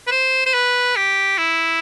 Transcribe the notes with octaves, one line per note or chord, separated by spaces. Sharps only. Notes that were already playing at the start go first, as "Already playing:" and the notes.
B4
C5
C5
B4
G4
E4